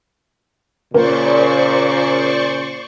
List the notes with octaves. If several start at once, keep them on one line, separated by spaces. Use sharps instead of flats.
A#2 C#3 A#3 C5 D5 C#6